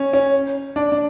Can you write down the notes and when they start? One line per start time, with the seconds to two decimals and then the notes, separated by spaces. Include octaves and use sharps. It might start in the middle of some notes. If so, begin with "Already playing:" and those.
Already playing: C#4
0.13 C#4
0.76 D4
0.92 D4